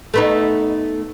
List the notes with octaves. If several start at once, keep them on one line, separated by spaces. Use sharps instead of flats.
A3 B3 D#4